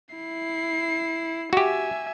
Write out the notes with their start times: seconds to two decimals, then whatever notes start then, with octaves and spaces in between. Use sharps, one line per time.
0.15 E4 C7
1.53 F#4 G4 E5 G#5